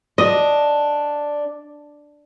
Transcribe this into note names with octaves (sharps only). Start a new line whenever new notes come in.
D4 D#5